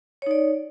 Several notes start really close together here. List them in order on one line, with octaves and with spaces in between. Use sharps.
C#5 D#4 D5